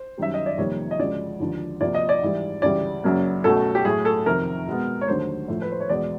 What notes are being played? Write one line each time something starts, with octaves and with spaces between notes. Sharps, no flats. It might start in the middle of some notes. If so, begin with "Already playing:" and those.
Already playing: C5
F#2 D#3 G3 E5
D#5
D5
F2 C3 D#3 G3 A#3 C#5
D#5
D2 C#3 F3 G#3 D5
D#2 D3 F3
D2 C3 F3 A#3 D5
D#5
D5
G#2 E3 G3
D2 C#3 E3 G3 D5
F#2 C#3 F#3 A#3
C#2 B2 F#3 A3 A4
G4
A2 F#3 A3 G#4
A4
F2 C3 D#3 A#4
B2 G#3 B3
C#5
D#2 D3 F#3 A3 C5
A2 F3 A3
B4
C5
C#5
E2 B2 G#3 B3 D5